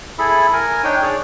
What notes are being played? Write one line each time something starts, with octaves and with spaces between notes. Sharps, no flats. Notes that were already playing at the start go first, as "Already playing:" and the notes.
E4 G#4 A4 B5
A#4 G#5
D4 D#4 C#5 G5
G#4 C#5 D5